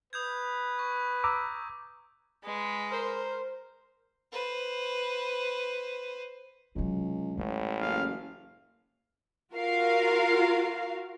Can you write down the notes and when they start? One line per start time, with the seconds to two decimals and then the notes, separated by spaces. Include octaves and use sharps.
0.13 B4 D#6 G6 G#6
0.79 C#6
1.24 A#5 D6 E6
2.44 G#3 B4
2.91 A#4 C5
4.32 B4 C5
6.75 C#2 C3 F#3
7.37 A1 G#3 E4
7.81 F#1 F5
9.54 F4 F#4 A#4 F5